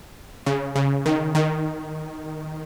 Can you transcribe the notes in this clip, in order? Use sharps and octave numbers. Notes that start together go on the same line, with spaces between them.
C#3
C#3
D#3
D#3